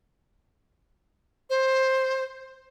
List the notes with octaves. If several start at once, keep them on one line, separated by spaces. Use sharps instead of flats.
C5